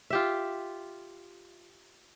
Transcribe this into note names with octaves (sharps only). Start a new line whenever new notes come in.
F4 G4 E5